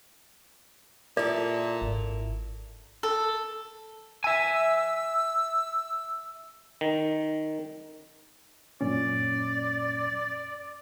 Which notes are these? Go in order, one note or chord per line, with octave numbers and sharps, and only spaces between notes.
A#2 E4 A4 D5
G#1
A4
E5 G#5 E6
D#3
F#2 A#2 C#4 D5